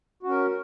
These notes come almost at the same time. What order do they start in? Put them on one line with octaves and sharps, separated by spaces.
F#4 C#4 A#4